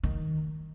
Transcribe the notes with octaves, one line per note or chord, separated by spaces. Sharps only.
D#3